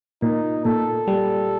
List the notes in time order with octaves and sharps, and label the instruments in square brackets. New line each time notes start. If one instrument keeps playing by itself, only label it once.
[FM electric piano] A#2 [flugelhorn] D#4
[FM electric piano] A#2 [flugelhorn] A4
[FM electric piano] G3